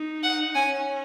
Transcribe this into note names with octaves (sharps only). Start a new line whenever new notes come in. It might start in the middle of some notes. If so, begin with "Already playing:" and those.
Already playing: D#4
F#5
C#4 G#5